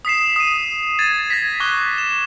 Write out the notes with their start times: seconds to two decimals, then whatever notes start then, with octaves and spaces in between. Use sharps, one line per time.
0.05 D#6 B6 C7 E7
0.36 D#6 D#7
0.99 G#6 A6 D#7
1.30 G#6 A#6 B6
1.60 C#6 D6 F#6 B6 G7
1.98 E7